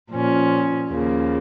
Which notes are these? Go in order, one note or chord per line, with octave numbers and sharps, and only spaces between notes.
A#2 F3 C#4
D#2 C#3 F3 A#3